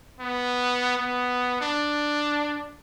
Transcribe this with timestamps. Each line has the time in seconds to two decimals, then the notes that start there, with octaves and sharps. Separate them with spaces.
0.20 B3
0.98 B3
1.61 D4